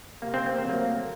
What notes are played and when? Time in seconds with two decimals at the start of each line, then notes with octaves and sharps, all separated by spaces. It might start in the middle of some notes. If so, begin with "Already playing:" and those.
0.22 C3 A#3
0.34 C4
0.46 A#3
0.58 C4
0.65 F#3 A3 A#3